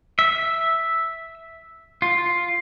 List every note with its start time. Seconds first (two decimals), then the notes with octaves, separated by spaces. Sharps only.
0.19 E5
2.02 F4